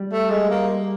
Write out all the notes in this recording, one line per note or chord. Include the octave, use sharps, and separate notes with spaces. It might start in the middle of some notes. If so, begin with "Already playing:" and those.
Already playing: G3
A3
G#3
A#3